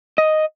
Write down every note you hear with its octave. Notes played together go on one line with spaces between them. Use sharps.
D#5